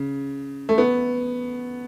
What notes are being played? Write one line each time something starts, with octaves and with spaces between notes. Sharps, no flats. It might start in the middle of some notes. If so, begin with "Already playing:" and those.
Already playing: C#3
A3
B3